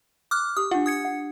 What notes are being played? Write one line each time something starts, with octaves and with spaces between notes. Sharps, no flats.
D6 F6 F#6
G4 D#6
D4 F4 F#5
D#6 G#6 C#7
F#5